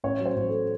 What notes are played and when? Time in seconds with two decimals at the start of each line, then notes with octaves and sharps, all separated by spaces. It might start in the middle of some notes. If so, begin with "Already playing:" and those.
0.04 A1 C#5
0.20 F#3
0.26 C5
0.36 A1
0.48 A4